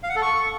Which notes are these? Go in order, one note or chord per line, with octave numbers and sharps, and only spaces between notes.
F5
F#5
A4
C#6